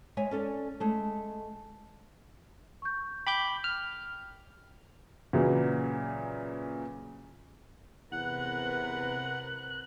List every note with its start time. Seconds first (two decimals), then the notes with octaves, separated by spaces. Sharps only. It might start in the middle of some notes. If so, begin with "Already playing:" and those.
0.17 G#3 C#5 E5 G#5
0.31 C#4 A4 D5
0.80 G#3 A3
2.82 C#6 G6
3.27 G5 B5 D6 G6
3.64 F6
5.33 A#2 C#3 E3 F#3
8.12 E2 C3 A#4 B4 F#5 F#6